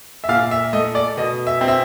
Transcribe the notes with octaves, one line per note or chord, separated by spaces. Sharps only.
E5
A#2 F5
E5
A3 D#5
D5
B2 D#5
E5
C4
E5